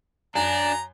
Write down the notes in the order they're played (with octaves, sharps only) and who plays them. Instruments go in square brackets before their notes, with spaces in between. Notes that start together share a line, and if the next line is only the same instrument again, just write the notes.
[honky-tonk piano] F#2 [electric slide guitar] D4 [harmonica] A#5